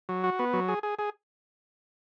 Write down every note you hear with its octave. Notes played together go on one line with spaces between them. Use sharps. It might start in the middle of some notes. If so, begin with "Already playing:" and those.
F#3
F#4
B3
F#3
G#4
G#4
G#4